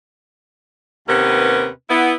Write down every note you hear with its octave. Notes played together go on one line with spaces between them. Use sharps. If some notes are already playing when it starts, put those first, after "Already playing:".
D#2 C3 B3 C#4 A#4 B4
B3 E4